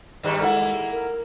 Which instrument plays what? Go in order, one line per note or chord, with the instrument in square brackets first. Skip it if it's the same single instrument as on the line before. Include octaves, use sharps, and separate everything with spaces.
[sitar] G2 D#3 G3
[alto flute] G#3 [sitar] A#3 E4 [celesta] A4 F#5
[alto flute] A#4